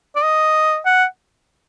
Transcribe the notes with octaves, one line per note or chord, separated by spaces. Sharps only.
D5
D#5
F#5